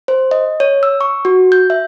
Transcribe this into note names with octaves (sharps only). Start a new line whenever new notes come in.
C5
D#5
C#5
E6
C#6
F#4
G6
E5